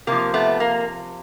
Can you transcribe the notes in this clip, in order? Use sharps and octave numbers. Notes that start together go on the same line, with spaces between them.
C3 F3 A#3
A3 B3
A#3